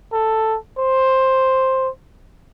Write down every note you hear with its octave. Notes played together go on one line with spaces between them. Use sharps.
A4
C5